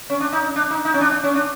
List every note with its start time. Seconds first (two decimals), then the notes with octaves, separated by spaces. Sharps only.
0.10 C#4
0.20 D4
0.33 D#4
0.56 D4
0.71 D#4
0.85 D#4
0.94 C#4
1.01 D4
1.12 D4
1.23 C#4
1.35 D4